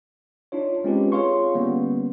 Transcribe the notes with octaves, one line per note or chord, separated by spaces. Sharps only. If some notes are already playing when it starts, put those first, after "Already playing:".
D4 D#4 F4 C#5
G#3 C4 C#4 F4 G4 B4
F4 G#4 C#5 F5 C6 C#6
D3 G3 A#3 B3 C#4